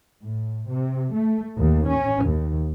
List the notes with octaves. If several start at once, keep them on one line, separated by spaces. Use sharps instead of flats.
A2
C3
A3
D#2
C#4
D#2